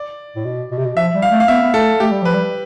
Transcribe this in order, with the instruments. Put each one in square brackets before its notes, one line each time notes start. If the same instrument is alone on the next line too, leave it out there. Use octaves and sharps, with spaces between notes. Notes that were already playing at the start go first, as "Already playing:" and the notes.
Already playing: [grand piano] D5
[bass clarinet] A2
B2
B2
C3
B2
[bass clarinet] F3 [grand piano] E5
[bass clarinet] G3
[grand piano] F5
[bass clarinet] A3
[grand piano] F5
[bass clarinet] B3 [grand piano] E5
[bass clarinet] B3
[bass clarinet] A3 [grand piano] A4
[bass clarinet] A3 [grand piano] G4
[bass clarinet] G3
[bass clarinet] F3 [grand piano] B4
[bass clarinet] G3